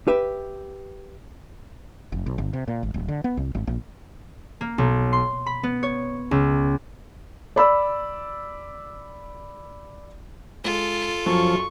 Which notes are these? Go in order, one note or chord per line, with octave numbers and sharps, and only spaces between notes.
G4 B4 E5
F1
B1
G1
C3
A#2
G#1
D1
D3
B3
C2
G#1
A#1
A#3
B1
C6
B5
B3
C#5
C#2
D5 B5 E6
G#3 F4 A4
F#2 F3 F#3 C#6